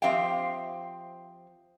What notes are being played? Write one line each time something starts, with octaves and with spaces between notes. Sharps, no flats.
F3 C4 G4 E5 F5 G5